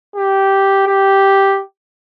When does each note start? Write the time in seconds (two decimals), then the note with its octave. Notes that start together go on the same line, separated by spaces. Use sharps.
0.16 G4
0.87 G4